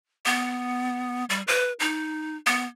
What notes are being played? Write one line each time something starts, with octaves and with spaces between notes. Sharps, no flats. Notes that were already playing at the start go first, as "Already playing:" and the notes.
B3
G3
B4
D#4
B3